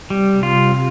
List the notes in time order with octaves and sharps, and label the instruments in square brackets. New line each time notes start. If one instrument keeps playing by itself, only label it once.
[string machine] C3 [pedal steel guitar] G3
[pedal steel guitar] F4